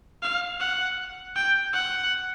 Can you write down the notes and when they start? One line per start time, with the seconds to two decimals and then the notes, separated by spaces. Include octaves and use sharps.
0.22 F5
0.60 F#5
1.36 G5
1.73 F#5